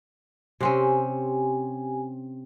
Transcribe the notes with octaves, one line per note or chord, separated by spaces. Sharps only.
C3 C4 C#4 G4 G#5